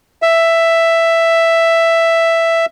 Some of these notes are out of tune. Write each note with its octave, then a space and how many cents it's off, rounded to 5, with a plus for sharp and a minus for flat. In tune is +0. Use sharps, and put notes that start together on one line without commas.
E5 +5